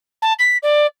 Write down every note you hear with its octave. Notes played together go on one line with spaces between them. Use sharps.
A5
B6
D5